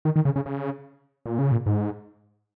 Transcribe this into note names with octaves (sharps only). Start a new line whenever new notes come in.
D#3
D#3
C#3
C#3
C#3
A#2
C#3
A#2
G#2